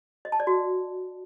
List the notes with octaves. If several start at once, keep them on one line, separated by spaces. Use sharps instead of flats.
D#5
A5
D5
F#4